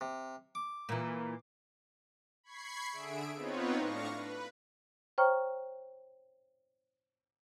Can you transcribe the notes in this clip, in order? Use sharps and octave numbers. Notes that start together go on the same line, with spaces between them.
C3
D6
A#2 E3
B5 C#6 G#6 C7
D3 G#4 E5 D7
B3 C4 D#4 F4 B4 C#5
A2 D4 F5 C#6 A#6
B4
C5 C#5 G5 A#5 C#6 F6